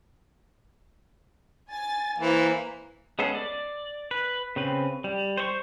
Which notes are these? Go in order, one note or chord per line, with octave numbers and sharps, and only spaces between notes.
G#5 A6
E3 A#3 C5
G#3 B3 C#4 G#4 A4
D5
B4
C#3 C4 B4
G3
C5 C#5 C#6